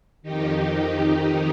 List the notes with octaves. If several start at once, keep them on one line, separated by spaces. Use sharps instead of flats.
F2 D#3 D#4 G4